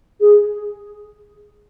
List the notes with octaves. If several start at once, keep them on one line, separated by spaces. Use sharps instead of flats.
G#4